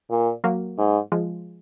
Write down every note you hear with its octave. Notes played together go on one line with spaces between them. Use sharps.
A#2
F#3 A#3
G#2
F3 G#3